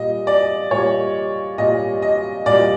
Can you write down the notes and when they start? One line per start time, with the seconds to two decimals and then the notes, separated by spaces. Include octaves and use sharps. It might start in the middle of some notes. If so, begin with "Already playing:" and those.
Already playing: A#2 G3 D#5
0.27 D5
0.71 A#2 G3 C#5
1.58 A#2 G3 D#5
2.02 D#5
2.46 A#2 G3 D5